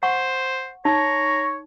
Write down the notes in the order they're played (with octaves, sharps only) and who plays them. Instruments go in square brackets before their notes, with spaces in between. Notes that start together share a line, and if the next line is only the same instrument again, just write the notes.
[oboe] C5 [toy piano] F#5 C#6
[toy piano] D#4 [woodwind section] C#5 [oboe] A#5